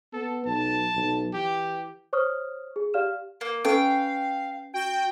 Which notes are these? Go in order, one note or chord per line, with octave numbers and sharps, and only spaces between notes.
B3 A4
B1 A5
B1
E3 G4
C5 C#5 C#6 D#6 F6
G#4
G4 D5 F5 F6 E7
A#3
C#4 A4 B4 F5 G5
F#4 G5